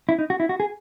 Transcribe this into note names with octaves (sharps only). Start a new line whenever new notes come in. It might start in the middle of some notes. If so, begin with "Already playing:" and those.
E4
D#4
F#4
E4
F#4
G#4